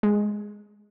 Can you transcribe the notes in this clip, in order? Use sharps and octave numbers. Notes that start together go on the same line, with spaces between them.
G#3